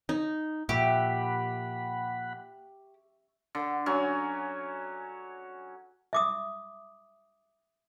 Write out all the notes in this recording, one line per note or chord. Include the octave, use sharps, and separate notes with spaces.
D#4
A#2 F3 G4 E5 F#5 B5 C#6
D3
F#3 C#4 G#5
E5 D6 D#6